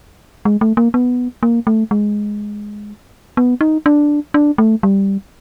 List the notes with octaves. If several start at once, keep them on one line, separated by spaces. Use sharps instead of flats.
G#3
A3
A#3
B3
A#3
A3
G#3
B3
D#4
D4
D4
A3
G3